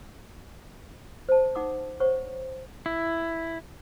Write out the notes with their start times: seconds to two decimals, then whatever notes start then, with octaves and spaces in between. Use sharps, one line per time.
1.29 C5 A5
1.55 D#4 F#5 D6 D#6
2.00 C5 C#5 F#5 C#6
2.86 E4